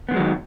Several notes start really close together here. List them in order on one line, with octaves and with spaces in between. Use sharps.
B3 D3 G#3 F#3 D#3